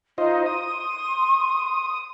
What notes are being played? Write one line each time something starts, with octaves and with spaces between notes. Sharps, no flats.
D#4 F4 C5 D#5
C6 D#6